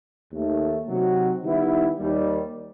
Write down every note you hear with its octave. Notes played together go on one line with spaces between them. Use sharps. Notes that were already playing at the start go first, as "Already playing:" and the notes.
D#2 D#3 A3
C3 F#3 C4 D#4 F#4
D#3 G3 B3 E4
D#2 D#3 G3